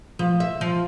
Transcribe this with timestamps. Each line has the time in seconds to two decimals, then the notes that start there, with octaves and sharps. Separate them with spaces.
0.19 F3
0.40 E5
0.61 F3